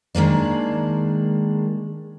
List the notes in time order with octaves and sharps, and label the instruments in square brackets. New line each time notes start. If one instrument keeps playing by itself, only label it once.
[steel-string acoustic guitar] D#3 G#3 A#3 D4